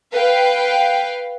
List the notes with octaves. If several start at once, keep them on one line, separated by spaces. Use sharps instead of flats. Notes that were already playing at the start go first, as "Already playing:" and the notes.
B4 F5 G5